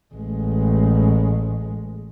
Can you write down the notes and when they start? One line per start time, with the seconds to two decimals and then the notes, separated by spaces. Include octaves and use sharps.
0.14 A1 G#3